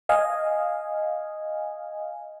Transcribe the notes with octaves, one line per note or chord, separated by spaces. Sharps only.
D#5 F5 G#5